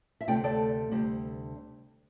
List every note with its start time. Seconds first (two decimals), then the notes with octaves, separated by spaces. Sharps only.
0.21 E5
0.28 D2 C3 A3 D5 G5
0.44 A4 D5
0.91 D2 C3 G3